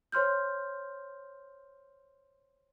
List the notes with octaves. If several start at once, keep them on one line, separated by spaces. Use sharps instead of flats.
C5 C#5 C6 F6 G6